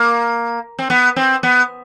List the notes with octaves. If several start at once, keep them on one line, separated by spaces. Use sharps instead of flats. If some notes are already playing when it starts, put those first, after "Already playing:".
Already playing: A#3
C4
B3
C4
B3